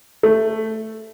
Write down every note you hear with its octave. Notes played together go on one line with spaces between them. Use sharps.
A3